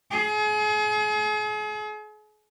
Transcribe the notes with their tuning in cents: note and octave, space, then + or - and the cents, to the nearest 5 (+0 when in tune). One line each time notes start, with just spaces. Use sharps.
G#4 +35